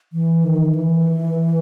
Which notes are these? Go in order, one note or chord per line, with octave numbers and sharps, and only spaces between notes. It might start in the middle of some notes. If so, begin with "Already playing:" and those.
E3
D#3
E3